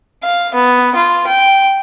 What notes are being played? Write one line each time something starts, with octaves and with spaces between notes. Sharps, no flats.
F5
B3
F4
G5